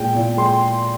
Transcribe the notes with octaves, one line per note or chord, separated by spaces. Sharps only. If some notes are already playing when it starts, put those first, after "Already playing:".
Already playing: A#2 G#3 G5
A#2
G#3 C6